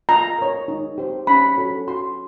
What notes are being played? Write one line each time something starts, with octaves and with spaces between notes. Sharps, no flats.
F4 A#5
A#4 C#5
D#4
G4 C5
C#4 B5
F#4 A4 C#5
F#4 C6